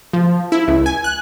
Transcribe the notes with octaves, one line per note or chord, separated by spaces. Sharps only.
F3
E4
C#2
G#5
F#6